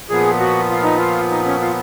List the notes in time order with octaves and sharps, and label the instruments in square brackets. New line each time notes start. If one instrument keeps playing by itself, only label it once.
[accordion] A#2 F3 B3 G#4
F#4
F4
D#4
F4
D#4
C#4
F4